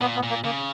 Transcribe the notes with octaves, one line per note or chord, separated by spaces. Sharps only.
A#2 B3
B3
A#2
A#3
C#3 A#3